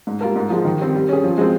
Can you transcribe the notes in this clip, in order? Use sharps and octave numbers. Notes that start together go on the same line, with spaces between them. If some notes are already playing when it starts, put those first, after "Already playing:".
G#2
G3 A#3 F4 A#4
G#2
F3 G#3
D#3
G3 C4
G3
C#4 G#4
F3
G#3 C4